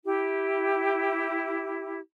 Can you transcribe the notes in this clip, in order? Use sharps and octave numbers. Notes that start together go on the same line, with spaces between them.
E4 G4